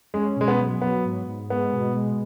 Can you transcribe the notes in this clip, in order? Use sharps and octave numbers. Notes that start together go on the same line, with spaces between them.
G#3 C#4
B2 G#3
B3
F#3
F#3 B3
G#2
G#2
G#3 B3
B2
G#3